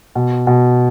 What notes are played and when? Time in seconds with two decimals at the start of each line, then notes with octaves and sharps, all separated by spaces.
0.15 B2
0.47 B2